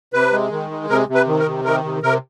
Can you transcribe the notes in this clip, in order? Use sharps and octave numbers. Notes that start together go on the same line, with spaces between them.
C3 B4
G#3
D#3
G#3
C3 A#4
C3
B4
D#3
A#4
C3
D#3 A#4
C3
C3 A#4